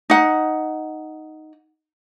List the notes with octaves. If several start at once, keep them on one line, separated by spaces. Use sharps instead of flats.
D#4 F#5